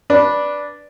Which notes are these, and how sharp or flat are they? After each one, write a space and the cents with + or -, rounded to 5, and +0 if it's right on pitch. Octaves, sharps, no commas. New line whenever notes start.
D4 +0 B4 -10